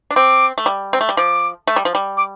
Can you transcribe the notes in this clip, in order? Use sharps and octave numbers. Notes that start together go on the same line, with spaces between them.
D4
C4 D6
A3
G3
C4
A3
G3
F3 D6
A3
G3
F3
G3
D6